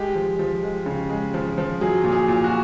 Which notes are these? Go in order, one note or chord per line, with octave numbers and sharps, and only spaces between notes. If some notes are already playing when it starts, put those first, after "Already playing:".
Already playing: G#3 G4
F3
F3
G#3
C#3
G#3
F3
F3
F#3 G#4
A#2
G#4
A#2
F#4